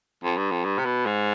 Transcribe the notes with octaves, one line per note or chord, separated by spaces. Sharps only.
F2
G2
F2
G2
C3
B2
G#2